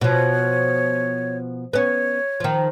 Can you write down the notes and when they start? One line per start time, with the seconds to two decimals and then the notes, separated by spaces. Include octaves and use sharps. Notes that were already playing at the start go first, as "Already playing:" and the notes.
0.01 B2 F3 C#5
1.73 B3 C#4 C#5
2.40 D#3 F3